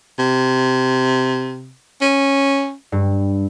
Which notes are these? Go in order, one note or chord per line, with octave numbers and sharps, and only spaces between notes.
C3
C#4
G2